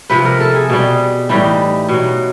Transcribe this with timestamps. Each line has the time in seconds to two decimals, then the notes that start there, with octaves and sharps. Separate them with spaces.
0.10 C3 F3 B4
0.25 A#4
0.40 A4
0.55 G#4
0.70 B2 G3
1.29 A2 E3 G3 D#4
1.89 B2 F#3